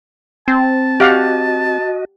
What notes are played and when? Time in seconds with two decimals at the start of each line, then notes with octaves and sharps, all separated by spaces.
0.48 C4 A5
1.00 F#4 G4 D#5 F5 F#5